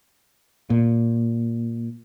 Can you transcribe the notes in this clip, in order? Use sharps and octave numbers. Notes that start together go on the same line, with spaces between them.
A#2